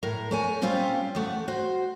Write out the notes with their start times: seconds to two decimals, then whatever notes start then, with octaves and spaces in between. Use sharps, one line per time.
0.03 A2 A#4
0.31 A3 C#5 G#5
0.62 A#2 G3 C4 C#4 F4 G4
1.15 E2 A3 F#5
1.48 F#4 C5